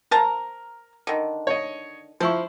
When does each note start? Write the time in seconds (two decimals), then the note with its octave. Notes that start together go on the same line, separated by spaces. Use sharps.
0.11 A#4 C5 A5 A#5
1.07 D3 D#3
1.47 C#5 D#5
2.20 F3 E4 C5 C#6